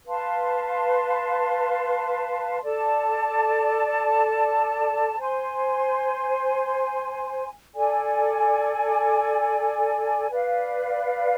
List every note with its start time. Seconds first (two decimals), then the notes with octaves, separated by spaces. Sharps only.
0.07 B4 F5 A5 C6
2.63 A4 D5 A5
5.19 C5 G#5 C6
7.74 A4 D5 G#5
10.30 B4 D5 F5